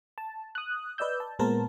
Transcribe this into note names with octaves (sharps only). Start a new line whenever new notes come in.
A5
D#6 F#6
B4 D5 D#5 E6 G6
A5
A#2 G#3 B3 A#4 C5 A5